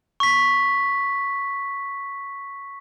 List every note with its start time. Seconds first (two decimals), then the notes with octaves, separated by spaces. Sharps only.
0.20 C#6 B6